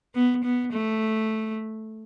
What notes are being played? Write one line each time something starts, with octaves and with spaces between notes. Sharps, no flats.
B3
B3
A3